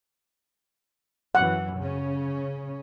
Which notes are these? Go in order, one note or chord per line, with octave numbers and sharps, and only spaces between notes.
F#2 E3 F#5
C#3 C#4